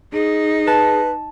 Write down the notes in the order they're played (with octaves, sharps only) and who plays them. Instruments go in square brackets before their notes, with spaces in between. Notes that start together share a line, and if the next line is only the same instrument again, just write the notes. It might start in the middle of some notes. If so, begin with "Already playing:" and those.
[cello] D#4 [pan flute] G#4
[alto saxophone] B4 [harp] A5